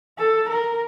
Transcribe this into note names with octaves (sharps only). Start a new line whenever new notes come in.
A4
A#4